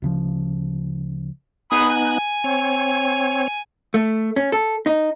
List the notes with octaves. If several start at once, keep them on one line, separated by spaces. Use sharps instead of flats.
D2 C#3 F3
B3 D#4 G#5 B5 D#6 F#6
G#5
C4 C#5
A3
C#4
A4
D#4